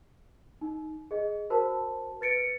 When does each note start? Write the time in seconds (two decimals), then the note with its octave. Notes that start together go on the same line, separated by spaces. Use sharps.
0.61 D#4
1.11 G#4 D#5
1.50 F#4 A#4 C5 A5
2.21 B4 A6 C#7 D7